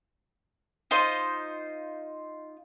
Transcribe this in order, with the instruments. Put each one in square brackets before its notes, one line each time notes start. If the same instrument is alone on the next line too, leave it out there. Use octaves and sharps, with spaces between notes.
[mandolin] D#4 F4 C5 D#5